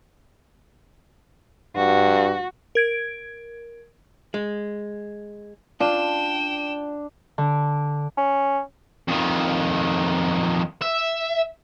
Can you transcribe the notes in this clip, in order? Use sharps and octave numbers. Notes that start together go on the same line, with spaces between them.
G2 F#4
A#4 G#6 D7
G#3
D4 F4 G5 E7
D3
C#4
F2 D#3
E5